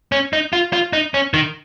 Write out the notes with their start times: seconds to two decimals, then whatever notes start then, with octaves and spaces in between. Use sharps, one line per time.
0.12 C#4
0.33 D#4
0.53 F4
0.73 F4
0.93 D#4
1.14 C#4
1.34 D#3